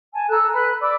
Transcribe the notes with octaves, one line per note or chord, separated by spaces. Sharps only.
G#5 A5
A4 A#5 E6 F#6
B4 B5 F#6
D5 B5 D6 E6